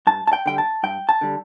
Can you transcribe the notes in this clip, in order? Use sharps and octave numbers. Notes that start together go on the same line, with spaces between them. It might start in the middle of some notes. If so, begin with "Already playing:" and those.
G2 A5
A5
G5
D3 G3 G5
A5
G2 G5
A5
D3 G3